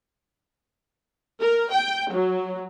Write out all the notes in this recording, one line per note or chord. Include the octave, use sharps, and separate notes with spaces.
A#4
G5
F#3